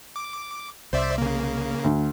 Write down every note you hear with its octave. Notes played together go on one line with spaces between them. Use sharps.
D6
C2 C5 D5 E5
C#3 A#3
D2